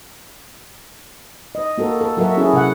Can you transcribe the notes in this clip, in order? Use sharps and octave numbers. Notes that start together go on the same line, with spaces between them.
D#5
A#3 F#4 A4 A#4
A4
F#3 F#4 A4 A#4 E5
C#4 E4 F#4 G#4
C3 F#5